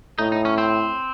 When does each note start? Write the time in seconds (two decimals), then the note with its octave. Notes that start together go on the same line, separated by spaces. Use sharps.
0.19 A2 D#4
0.32 D#4
0.45 C#4
0.58 C4